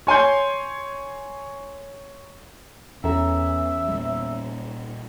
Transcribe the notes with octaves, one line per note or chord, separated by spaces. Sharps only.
C#5 G#5 C6 G6
E2 E3 C#4 A4 E5 A#5
A#2 G3